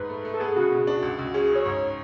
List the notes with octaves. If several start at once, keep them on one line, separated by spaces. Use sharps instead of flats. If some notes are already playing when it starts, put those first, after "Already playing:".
Already playing: G#2 B4
A3
A3
A4
B3 G#4
C#3 F#4
B2
D4
C#2
C#2
C#4 G#4
G#4
C#3
C#5
G#2 C#5